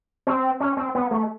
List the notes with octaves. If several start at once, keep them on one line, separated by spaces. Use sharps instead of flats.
C4
C#4
C4
B3
A3